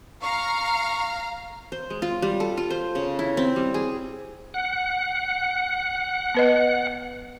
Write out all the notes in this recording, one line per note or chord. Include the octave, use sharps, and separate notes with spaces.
F5 A#5 C#6
C5
G#3
F4
G3
A4
F4
C5
C#3
E4
C4
G3
G#4
F#5
B3 B4 D#5